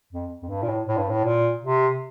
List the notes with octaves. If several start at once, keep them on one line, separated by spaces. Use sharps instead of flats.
F2
F2
G2
A#2
A2
A2
G2
A2
A#2
C3